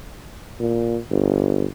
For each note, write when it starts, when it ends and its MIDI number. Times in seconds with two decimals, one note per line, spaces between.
0.60 0.98 46
1.11 1.66 31